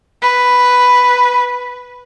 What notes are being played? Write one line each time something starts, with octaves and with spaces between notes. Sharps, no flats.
B4